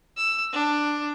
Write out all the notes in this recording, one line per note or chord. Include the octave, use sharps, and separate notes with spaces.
E6
D4